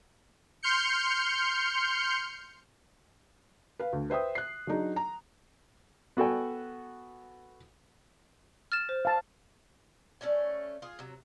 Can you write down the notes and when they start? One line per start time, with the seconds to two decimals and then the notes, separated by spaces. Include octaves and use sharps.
0.63 C6 F6 G6 C#7
3.79 B4 F5
3.93 D2
4.10 B4 C5 E5 G5 D#6
4.35 F#6 C7
4.67 F#3 D4 D#4 G#4
4.96 A#5
6.17 B3 F#4 A4 G5 G#5
8.72 F6 A6 E7
8.89 C5
9.05 F5 A5
10.21 A3 C#4 D5 G#5
10.82 F4 G#4
10.99 C3 F#3